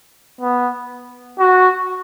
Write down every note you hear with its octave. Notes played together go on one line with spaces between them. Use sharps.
B3
F#4